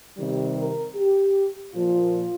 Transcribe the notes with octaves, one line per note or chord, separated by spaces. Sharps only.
C3 D#3 G3
A#4
G4
A#2 F3 F4